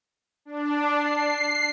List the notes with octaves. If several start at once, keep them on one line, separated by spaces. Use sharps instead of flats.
D4
C7